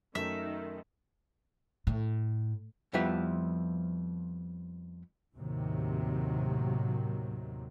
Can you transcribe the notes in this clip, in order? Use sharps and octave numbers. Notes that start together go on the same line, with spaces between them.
F#2 D#3 A3 E5
A2
F2 F3 G3 B3 E4 E5
D#2 A2 C3 D#3 F#3